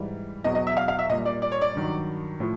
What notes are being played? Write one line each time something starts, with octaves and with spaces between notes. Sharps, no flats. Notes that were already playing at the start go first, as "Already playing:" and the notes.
Already playing: G#2 E3 G3
E2 B2 F#3 D#5
D#5
E5
F5
F5
E5
A#2 G3 D#5
D5
D5
C#5
D5
G2 D#3 F#3
A2 F3